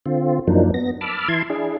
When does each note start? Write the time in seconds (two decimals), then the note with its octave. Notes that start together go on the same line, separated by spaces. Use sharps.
0.06 D3 C4 F4
0.48 F#2 F3 F#3 A#3 D4 D#4
0.74 B3 A#6
1.01 A5 B5 D6 E6 F6
1.28 E3 E4 A5 C6 G#6
1.50 D4 E4 G#4